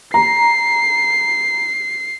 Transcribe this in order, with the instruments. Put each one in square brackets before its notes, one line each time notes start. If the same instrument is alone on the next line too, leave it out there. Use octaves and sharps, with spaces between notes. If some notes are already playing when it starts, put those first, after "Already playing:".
[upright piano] A#5 [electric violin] C7